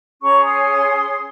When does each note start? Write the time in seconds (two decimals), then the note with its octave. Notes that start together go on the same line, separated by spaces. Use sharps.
0.21 C#4 G#4 C#5 A#5 C#6
0.45 C6 D#6